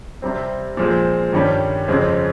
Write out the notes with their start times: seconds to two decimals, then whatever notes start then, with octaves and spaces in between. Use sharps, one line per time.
0.22 C3 G3 C4
0.77 A#2 F3 G#3 C4
1.33 G2 D#3 G3 C#4
1.88 F2 C#3 G#3 C4